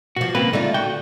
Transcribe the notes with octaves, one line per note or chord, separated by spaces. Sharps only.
B2 F3 F#4
C#3 A#3 C4 B4
D3 A3 D#4 F4
F#4 G5